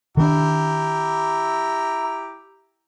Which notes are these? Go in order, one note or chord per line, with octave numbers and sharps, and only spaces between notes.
D#3 C4 D4 E4 G4 A#5